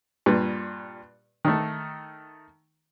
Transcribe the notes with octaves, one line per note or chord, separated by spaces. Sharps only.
G2 A#2 B4
D#3 A3